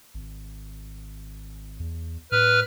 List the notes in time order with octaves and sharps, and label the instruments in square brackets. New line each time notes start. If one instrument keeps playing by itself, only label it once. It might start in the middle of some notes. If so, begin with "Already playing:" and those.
[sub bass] G#1
E2
[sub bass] A2 [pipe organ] B4 F6